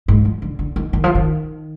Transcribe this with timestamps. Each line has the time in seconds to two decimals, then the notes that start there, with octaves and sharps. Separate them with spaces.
0.08 G#2
0.25 F3
0.42 D3
0.59 D3
0.76 D#3
0.93 D#3
1.04 F3
1.15 D#3